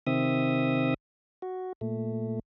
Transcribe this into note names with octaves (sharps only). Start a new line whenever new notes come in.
C3 D#3 C4 E5 D#6
F#4
A#2 A3